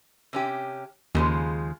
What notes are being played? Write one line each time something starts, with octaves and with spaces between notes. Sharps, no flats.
C3 C#4 G4
D#2 C#3 F3 G#3